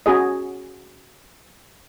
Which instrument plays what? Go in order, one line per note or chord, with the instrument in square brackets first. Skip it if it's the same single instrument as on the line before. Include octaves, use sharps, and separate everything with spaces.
[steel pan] C#4 F#4 G#4 D#5